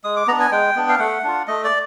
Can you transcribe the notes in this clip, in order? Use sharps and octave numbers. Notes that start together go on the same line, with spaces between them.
G#3 D#6
D6
B3 D4 A#5
G#5
G#3 G5
B3 D4
F5
A3 F#5
D4 F4
A3 D#5
D5